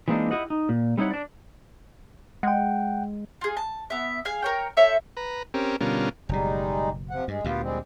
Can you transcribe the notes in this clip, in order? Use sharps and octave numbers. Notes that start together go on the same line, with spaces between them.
E3 G#3 A#3 C4 D4 D#4
E4 F#4 G4 D#5 F#5
D#4
A#2
G3 C4 D#4 E4 C#5 F#5
D4 D5
G#3 F#5 G5
F4 G#4
A5
B3 E5
G#4 F5 G#5
A#4 C#5 G5
A4 C5 C#5 E5
B4 A#5
C4 C#4 G4 A#4
B2 D3 G3 C#4 F4 A#4
F#1 B2 G3 G#3 D#4
C3 F3 F#5
G2 G#3
D2 A#2 B3 F4 G4
G3 G#3 C4